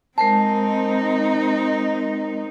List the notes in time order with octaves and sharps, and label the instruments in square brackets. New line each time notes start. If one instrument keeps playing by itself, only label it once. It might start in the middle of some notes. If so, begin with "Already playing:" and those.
[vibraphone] G#3 A#4 C5 [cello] C4 D#4 [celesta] A5